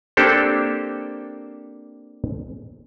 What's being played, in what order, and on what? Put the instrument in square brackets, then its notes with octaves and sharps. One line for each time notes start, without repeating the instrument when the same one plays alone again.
[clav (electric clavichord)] A#3 C4 D4 G4 A4 C5